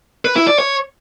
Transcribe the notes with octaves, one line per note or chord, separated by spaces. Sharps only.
B4
E4
D5
C#5